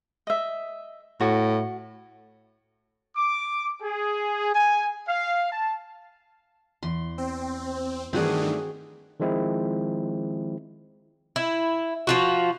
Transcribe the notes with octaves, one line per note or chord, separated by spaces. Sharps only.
D#5 E5
A2 F#4
D6
G#4
G#5
F5
A5
E2 C6
C4
G2 D#3 E3 A3 C4 D4 F#4 G#4
D#3 F3 G#3 C4 E4
E4
F3 F4 F#4